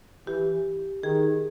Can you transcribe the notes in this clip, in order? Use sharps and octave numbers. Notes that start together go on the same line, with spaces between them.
E3 G4
D#3 G#4